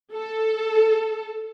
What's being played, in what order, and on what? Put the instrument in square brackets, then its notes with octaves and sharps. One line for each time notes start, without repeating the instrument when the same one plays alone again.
[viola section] A4